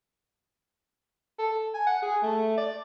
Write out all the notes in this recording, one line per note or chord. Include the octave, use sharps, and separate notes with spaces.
A4
G#5
F#5
G#4
A3
D5